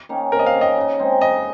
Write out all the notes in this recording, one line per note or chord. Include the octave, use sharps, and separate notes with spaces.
D#3 A#3 C#4
C3 A#4
D#5
F5
D#3 A#3 C#4
D#5
C#3
G#3 C4 D#4
C#3 D#5